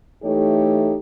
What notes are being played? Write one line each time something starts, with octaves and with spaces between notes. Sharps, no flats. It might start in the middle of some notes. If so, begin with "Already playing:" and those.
E3 A3 D#4 G4 A4 C#5